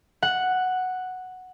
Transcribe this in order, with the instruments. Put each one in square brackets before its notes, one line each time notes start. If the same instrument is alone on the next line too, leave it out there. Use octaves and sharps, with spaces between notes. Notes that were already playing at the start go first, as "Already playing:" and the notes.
[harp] F#5